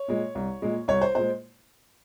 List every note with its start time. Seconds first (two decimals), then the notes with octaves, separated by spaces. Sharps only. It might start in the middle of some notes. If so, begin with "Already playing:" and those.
Already playing: C#5
0.08 A#2 G#3
0.35 C2
0.62 A#2 G#3
0.88 C2 C#5
1.02 C5
1.15 A#2 G#3 C5